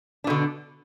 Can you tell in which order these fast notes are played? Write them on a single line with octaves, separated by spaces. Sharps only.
D4 B2 D3